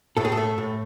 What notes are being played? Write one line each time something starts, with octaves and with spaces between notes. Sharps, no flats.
A2 A4
G#4
A4
A3
A2